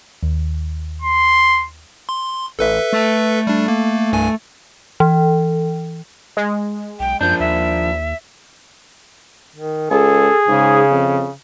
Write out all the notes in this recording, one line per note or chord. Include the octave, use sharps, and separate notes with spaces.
D#2
C6
C6
A1 A4 B4 E5
A3
G3 D4
A#3
C2 G2 G#5
E3
G#3
B1 G5
F#2 F3 D4 G6
D#2 E5
D#3
C#2 G#4 A4
G#2 C#3
F2